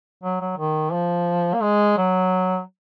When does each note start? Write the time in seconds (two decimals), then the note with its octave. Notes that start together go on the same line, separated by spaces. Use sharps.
0.23 F#3
0.41 F#3
0.57 D#3
0.92 F3
1.54 A#3
1.62 G#3
1.97 F#3